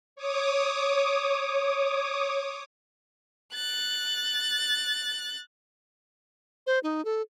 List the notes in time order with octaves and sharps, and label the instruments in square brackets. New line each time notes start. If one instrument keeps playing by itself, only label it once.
[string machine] C#5 D6 D#6
[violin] F#6 A6
[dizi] C5
D#4
A4